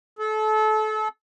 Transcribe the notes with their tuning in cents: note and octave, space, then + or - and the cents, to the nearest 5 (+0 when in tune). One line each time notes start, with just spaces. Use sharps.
A4 -30